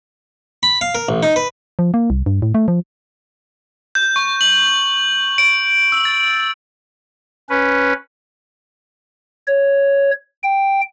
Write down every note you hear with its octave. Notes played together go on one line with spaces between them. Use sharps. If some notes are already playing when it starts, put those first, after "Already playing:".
B5
F5
A#4
A1
D#4
B4
F3
A#3
C2
G2
A2
A3
F3
G6
C#6
F#7
D7
E6
A6
C#4 B4
C#5
G5